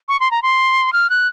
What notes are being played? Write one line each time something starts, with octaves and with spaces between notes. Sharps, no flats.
C#6
C6
A#5
C6
F6
F#6